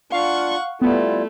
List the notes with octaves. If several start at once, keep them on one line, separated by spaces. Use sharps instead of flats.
D4 F4 F5 F#5 C#6
G3 A3 B3 E4 F4